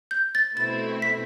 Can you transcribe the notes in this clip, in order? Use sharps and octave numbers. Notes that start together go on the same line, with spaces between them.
G6
A6
B2 A3 C4 E4 A6
B6